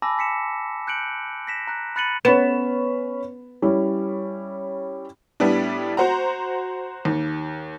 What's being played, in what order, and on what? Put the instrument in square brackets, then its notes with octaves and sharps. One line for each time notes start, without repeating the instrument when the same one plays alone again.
[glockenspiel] G#5 A5 B5 D6 E6 A#6
G#5 B6 C#7 E7
F#6 G6 C#7 D7 F#7
A#6 B6 E7
A#5 F#6
B5 F#6 A6 C#7 D#7 F#7
[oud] B3 [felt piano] C#4 B5 E7
[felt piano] G3 C#4 E4
[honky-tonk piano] A2 G3 B3 D4
F#4 C5 F#5 A#5
D#2